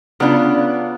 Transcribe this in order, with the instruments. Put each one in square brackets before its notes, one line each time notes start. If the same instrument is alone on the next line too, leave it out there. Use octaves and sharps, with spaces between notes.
[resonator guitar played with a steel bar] C#3 F#3 B3 D4 F4